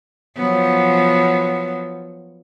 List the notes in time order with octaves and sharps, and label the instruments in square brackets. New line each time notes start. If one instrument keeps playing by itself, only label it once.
[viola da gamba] F3 F#3 B3